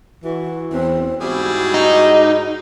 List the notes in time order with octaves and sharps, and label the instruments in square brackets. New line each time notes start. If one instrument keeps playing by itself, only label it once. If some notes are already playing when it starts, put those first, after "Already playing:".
[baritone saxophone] E3 [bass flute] F#4
[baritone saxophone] E2 [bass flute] C4
[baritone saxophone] G#2 [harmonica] G3 E4 G#4 [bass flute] F#4
[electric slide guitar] D#4